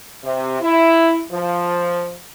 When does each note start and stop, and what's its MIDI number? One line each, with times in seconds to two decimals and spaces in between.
0.24 0.60 48
0.60 1.21 64
1.31 2.13 53